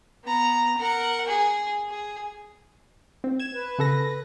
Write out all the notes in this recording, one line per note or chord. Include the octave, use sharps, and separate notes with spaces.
B3 A#5
A#4 F#5
G#4
G#4
C4
G#6 E7
B4
C#3 A4 A#6